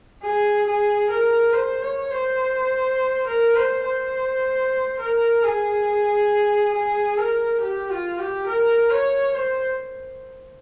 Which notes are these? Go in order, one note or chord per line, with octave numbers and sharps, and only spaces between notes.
G#4
G#4
A#4
C5
C#5
C5
A#4
C5
C5
A#4
G#4
G#4
A#4
G4
F4
G4
A#4
C#5
C5